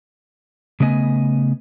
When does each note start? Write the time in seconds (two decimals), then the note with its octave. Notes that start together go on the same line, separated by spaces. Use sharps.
0.80 C#3 A3 B3 D#5 G#5